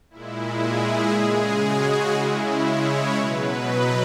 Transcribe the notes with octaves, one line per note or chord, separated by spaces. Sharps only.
A#2 G#3 E4
G#4
C#3 G#3 G#4
F#4
C#3 G#3 E4
C#5
B2 F#3 B4
D#5